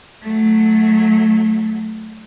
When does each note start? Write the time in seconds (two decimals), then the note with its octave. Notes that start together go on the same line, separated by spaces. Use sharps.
0.23 F#3 A3